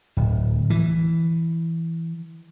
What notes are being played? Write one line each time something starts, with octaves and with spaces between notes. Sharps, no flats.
D1
E3